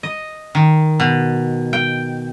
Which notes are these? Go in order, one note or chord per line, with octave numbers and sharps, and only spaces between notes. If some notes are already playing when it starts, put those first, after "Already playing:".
D#5
D#3
B2
G5